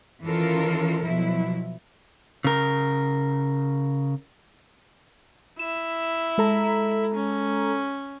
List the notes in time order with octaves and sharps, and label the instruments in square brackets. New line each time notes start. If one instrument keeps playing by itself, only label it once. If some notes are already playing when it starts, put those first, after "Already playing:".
[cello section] D#3 E3 C#4 F4 A4 A#4
B2 F3 F#3 E4
[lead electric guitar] C#3 A#4
[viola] E4 [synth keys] E7
[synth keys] G#3 A4 A#5
[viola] C#4